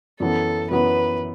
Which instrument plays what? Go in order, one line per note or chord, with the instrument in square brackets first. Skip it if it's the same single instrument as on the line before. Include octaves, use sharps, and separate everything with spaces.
[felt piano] F#2 E3 B3 [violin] A4
[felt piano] F#2 E3 B3 [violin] B4